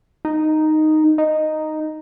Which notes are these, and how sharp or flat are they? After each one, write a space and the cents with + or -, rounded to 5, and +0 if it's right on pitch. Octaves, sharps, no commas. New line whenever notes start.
D#4 -5
D#4 -5